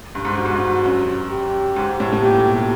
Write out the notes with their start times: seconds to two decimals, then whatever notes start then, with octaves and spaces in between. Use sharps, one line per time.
0.15 G2
0.25 G#2
0.35 G2 F#4
0.45 G#2
0.56 G2
0.85 F#2
1.30 G4
1.76 G#2
2.00 A2
2.13 A2
2.22 A#2 G4
2.46 B2